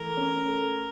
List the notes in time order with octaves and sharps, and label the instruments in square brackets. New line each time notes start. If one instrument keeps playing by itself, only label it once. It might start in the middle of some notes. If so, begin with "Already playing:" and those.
Already playing: [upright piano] E3 A3 [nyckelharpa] A#4
[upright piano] C#4
A3